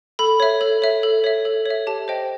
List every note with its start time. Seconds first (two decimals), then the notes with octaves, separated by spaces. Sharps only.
0.19 A4 B5
0.40 C#5 E5
0.61 A4
0.82 C#5 E5
1.03 A4
1.24 C#5 E5
1.45 A4
1.66 C#5 E5
1.87 G4 A5
2.08 C5 D#5 G5